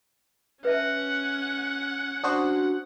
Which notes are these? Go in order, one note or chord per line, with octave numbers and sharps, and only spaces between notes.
C#4 B4 E5 F#5 A5
D4 F#4 C5 D#6